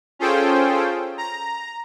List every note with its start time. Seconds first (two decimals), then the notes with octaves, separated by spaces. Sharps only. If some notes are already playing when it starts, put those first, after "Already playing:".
0.19 C#4 F4 G#4 A4 C5 G5
1.17 A#5